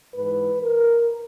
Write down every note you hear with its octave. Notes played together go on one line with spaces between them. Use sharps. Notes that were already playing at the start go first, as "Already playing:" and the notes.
G#2 E3 B4
A#4